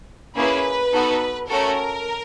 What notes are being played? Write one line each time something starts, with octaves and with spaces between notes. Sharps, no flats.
A#3 C#4 E4 G#4 B4
B3 D#4 F#4 A4
A3 C#4 F#4 A4 A#4